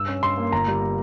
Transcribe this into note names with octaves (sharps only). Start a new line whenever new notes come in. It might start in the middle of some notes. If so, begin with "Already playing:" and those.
Already playing: G2 E6
C#4
G2 C6
A#3
G1 A#5
G3